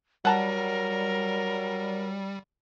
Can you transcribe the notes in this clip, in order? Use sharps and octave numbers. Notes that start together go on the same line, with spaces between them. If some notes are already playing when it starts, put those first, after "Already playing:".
F#3 G3 A#4 F#5 A5 A#5